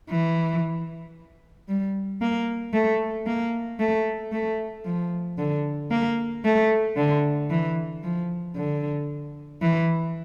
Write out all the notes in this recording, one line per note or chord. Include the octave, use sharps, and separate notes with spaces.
E3
G3
A#3
A3
A#3
A3
A3
F3
D3
A#3
A3
D3
E3
F3
D3
E3